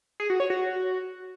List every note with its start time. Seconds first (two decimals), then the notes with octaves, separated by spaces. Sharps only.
0.20 G#4
0.30 F#4
0.40 C#5
0.50 F#4